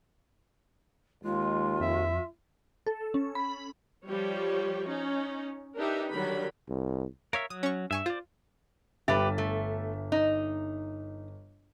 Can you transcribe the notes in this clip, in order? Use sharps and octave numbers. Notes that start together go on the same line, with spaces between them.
D#2 G#3 F4
F2 E5
A4
C#4
B5
F3 G3 G4 C#5
C#4 D#4
D4 D#4 G4 A#4 B4 E5
D3 D#3 F#3 G3 A#4 B5
C2
A#4 C#5 E5 F5
F#3 D#6
C#4 C#6
G2 E5 G#5 C#6
F4 C5 D5
G1 G4 B4 E5 A6
A3
D#4